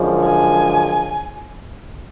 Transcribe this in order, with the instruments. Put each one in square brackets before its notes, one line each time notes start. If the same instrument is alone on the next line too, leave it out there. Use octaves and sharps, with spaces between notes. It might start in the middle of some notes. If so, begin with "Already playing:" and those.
Already playing: [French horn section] F#2 D3 F3 G#3
[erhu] G#5